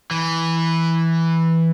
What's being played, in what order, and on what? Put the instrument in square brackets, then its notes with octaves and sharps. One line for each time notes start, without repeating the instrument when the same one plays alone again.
[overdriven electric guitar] E3